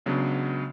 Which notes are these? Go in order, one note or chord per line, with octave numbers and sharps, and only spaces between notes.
C#2 C#3 F#3 B3 D4